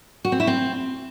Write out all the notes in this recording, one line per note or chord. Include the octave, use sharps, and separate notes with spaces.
F#4
C4
E4
C4